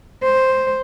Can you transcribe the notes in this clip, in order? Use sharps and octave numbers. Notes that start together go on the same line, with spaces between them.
C5